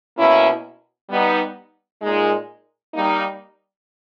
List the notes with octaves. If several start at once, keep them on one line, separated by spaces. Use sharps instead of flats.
B2 A#3 C#4 E4
G3 B3 D#4
A#2 G#3 D#4
G3 A#3 D#4